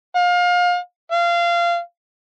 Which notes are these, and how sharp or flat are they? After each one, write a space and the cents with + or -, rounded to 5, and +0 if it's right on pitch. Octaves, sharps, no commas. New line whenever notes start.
F5 +30
F5 -20